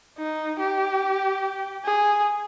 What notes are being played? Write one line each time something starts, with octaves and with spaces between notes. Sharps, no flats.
D#4
G4
G#4